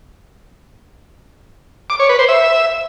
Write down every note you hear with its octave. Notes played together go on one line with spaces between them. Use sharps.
D6
C#5
B4
C5
E5